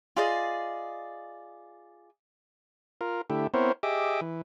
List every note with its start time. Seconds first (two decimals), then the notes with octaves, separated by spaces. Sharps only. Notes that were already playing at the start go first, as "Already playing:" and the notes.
0.16 F4 G#4 D5 D#5
3.01 F4 A#4
3.30 D3 A3 E4 G4
3.54 B3 C4 E4 A#4 C5 C#5
3.83 G4 G#4 D#5 E5 D6
4.21 E3